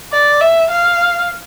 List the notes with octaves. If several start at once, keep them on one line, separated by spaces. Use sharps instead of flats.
D5
E5
F5